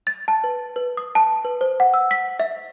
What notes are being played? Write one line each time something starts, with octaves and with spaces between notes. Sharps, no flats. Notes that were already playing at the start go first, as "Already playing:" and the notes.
A6
A5
B4
B4
D#6
A5
B4
C5
F#5
E6
B6
E5